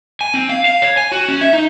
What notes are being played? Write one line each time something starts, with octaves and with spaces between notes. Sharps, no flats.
G#5
C4
F5
F5
C#5
G#5
F#4
C#4
E5
D#4